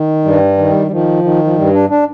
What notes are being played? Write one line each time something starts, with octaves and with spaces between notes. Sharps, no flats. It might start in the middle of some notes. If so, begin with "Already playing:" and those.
Already playing: D#3
G2 G3
D#3
G3
D#3 F3
D#3
F3
G2 G3
D4
D4